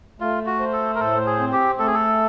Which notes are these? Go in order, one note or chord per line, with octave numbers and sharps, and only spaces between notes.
A3 F4
F#4
C5
A4
A#4
A2 A4
G#4
C4
G4
A3 A4
G#4
A4